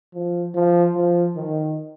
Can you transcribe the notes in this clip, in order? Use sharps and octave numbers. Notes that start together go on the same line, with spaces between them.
F3
F3
F3
D#3